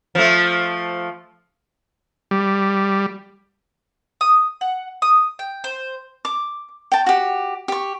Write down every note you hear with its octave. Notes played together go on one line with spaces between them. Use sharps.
F3 A3
G3
D#6
F#5
D#6
G5
C5
D6
G5 A5
F#4 G4
G4 C#6